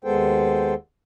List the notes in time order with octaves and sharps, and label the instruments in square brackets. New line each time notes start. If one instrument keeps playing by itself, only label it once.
[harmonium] D#2 G#3 B3 A4 C5 G5